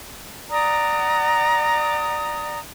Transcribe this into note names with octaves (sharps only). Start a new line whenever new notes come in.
D5 F#5 A#5 D#6